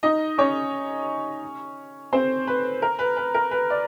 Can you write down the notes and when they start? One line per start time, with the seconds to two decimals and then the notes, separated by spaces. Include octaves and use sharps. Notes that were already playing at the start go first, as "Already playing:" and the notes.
0.03 D#4 D#5
0.38 C#4 C#5
2.13 C4 C5
2.47 B4
2.82 A#4
2.99 B4
3.17 B4
3.34 A#4
3.51 B4
3.70 D5